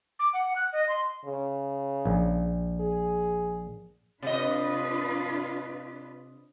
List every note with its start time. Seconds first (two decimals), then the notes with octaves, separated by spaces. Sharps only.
0.19 D6
0.33 F#5
0.56 F#6
0.73 D#5
0.89 C6
1.25 C#3
2.05 A#1
2.81 G#4
4.23 C3 D4 F4 B4 D#5